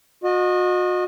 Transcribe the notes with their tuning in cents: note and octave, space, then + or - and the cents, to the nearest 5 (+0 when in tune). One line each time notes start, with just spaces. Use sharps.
F#4 -40 D#5 -20